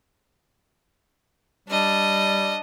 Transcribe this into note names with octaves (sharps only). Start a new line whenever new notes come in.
G3 D4 D#5